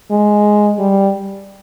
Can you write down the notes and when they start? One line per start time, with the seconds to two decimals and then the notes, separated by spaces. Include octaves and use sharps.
0.11 G#3
0.79 G3